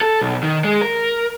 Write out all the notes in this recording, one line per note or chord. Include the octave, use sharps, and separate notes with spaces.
A4
B1
D#3
G#3
A#4